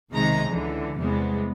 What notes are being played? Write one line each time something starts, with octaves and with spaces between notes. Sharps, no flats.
B1 C3 D#3 G#3 D#4 A#5
C#2 D3 E3
E2 C3 G3 G#3 B3